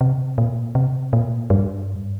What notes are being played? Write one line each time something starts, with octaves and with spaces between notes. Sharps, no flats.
C3
A#2
C3
A#2
G2